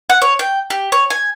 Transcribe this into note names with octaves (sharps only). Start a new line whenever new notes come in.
F#5
C#5
G5
G4
C#5
G#5